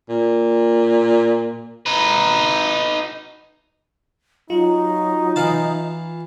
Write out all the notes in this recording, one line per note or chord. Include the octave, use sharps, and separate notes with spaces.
A#2
D#4 B4
F#3 D#4 F4
E3 F5 A5